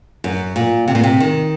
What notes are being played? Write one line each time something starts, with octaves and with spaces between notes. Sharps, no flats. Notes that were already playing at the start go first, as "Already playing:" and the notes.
F#2
A#2
C3
A#2
C3
D#3